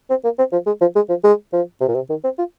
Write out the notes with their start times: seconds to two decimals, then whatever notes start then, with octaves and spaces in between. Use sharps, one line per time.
0.10 C4
0.24 A#3
0.39 C4
0.53 F3
0.67 G#3
0.81 F3
0.96 G#3
1.09 F3
1.24 G#3
1.53 F3
1.80 C3
1.88 A#2
1.95 C3
2.10 D#3
2.24 C4
2.38 F4